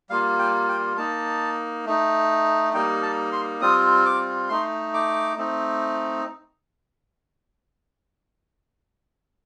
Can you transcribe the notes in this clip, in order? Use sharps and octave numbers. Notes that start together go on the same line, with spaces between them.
G3 A#3 F4 F5
G5
G5
A#3 D#4 A5
A3 D#4
G3 A#3 D#4 G5
A5
C6
G3 C4 F4 D#6
D6
A3 D#4 C6
D6
A3 C4 D#4